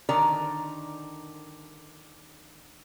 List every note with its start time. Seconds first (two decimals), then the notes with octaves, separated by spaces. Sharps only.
0.09 D3 D#3 A#4 D5 A#5